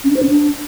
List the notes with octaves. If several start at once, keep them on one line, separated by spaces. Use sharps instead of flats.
C#4
D4
C5
C#4
D4